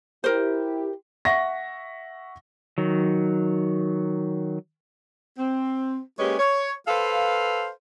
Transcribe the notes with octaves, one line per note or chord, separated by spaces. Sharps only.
E4 G4 A#4 C5
E5 F#5 C#6 A#6
D#3 F#3
C4
G#3 A#3 C#4 G4 B4 C#5
C#5
A4 B4 C5 F5